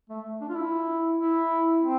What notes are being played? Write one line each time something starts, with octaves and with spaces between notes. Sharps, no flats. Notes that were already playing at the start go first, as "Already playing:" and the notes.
A3
D4
F4
E4
E4
C4